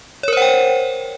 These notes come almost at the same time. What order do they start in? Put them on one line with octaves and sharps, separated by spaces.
C#5 A#4 C5 F#5 G5